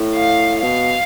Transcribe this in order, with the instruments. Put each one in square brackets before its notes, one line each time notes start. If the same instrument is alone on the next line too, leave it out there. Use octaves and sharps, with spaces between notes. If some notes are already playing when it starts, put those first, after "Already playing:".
Already playing: [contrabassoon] A2
[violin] F5
[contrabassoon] B2 [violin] F5